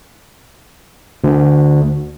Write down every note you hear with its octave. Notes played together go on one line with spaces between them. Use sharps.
D2